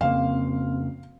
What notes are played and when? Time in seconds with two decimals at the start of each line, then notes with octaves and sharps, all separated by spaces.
0.01 F2 C#3 A#3 C4 F5